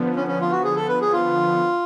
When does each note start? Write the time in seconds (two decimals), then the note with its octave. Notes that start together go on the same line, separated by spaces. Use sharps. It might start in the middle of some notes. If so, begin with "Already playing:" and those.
Already playing: D3 F3 B3
0.16 C#4
0.27 C#4
0.41 F4
0.51 F#4
0.64 G#4
0.76 A4
0.88 B4
1.01 G#4
1.13 F4